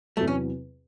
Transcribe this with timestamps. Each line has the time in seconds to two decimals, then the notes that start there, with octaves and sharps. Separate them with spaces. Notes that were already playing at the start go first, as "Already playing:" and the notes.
0.17 E2 C3 F#3 A3
0.27 C#4